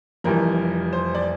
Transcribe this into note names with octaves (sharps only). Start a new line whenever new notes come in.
F1 F2 E3 G3 A#4
C5
D5